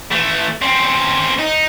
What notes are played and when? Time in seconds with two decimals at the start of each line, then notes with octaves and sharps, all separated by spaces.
0.11 E3 A3
0.62 C4 C#4
1.39 D#4